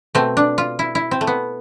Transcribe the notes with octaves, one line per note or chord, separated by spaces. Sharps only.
B2 A3 C4
D4
F4
E4
E4
C4
A3
B3